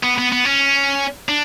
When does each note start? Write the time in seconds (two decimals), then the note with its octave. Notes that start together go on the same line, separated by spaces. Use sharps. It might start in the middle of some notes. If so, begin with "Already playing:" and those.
0.03 B3
0.18 B3
0.32 B3
0.45 C#4
1.29 D4